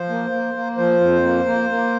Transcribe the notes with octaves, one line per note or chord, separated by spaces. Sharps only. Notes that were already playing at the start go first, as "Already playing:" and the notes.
Already playing: F3 C5
A#3
A#3
A#3
F3 C5
F2
A#3
A#3
A#3